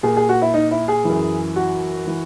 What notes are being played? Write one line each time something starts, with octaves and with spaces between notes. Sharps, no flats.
A#2 G#4
G#4
F#4
E4
D#4
E4
G#4
F#2 E3
F#4
E3